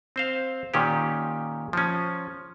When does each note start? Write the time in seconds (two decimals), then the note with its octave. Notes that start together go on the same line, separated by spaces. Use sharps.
0.16 C4 C5 F5
0.74 A#2 D#3 C#4 G4
1.73 F3 C#4